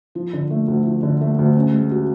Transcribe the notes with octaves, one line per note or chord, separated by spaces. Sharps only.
F3
D3
A3
D2
F3
D3
A3
D2
C#4
G#3
F#4